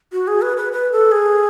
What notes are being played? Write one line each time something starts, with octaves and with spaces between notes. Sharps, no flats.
F#4
G#4
B4
B4
B4
A4
G#4